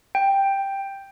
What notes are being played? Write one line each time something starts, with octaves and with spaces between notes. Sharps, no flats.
G5